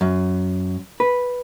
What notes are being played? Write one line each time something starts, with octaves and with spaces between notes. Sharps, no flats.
F#2
B4